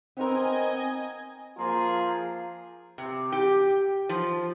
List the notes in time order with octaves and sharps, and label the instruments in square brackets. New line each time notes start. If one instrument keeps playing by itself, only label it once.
[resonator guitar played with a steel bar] B3 D#4 A#4 [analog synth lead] C4 [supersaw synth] D#5 G#5
[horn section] F3 A#3 G#4 [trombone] F4 [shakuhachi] A#5
[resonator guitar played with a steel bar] C3
G4
F3